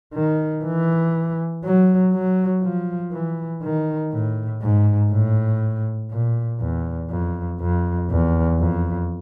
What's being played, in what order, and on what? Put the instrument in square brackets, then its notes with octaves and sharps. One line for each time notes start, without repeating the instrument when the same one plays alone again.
[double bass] D#3
E3
F#3
F#3
F3
E3
D#3
A2
G#2
A2
A#2
E2
F2
F2
E2
F2